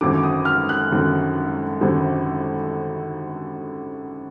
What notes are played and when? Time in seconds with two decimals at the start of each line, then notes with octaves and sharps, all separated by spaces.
0.01 G#1 F#2 D3 D6
0.23 D#6
0.45 F6
0.69 F#6
0.91 G#1 F#2 D3
1.81 G#1 F#2 D3